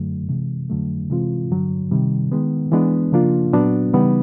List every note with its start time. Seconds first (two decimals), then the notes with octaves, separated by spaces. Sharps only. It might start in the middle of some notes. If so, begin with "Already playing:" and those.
Already playing: F#2 D3 F#3 A3
0.29 C3 E3 G#3
0.70 F2 D3 F#3 A3
1.10 C3 E3 G#3 C4 F4
1.51 G2 D3 F#3
1.91 C3 D#3 G3
2.32 D#3 G#3 B3
2.72 E3 G#3 B3 D4
3.12 C#3 F3 A#3 D4 F4
3.53 A#2 F#3 B3 D4 F#4
3.93 C#3 E3 G3 B3 D#4